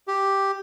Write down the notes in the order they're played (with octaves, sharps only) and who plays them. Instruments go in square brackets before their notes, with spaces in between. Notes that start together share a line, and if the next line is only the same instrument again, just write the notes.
[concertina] G4